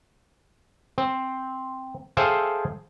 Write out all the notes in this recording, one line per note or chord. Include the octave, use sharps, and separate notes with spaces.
C4
G#4 A4 C5 E5 F5 G5